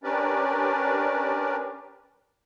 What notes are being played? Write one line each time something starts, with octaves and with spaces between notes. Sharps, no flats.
C#4 D4 G4 A#4 B4 D5